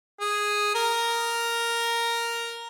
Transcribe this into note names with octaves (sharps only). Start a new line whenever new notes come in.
G#4
A#4